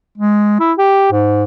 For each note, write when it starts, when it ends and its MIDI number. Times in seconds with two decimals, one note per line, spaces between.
0.18 0.57 56
0.60 0.73 64
0.78 1.09 67
1.12 1.44 44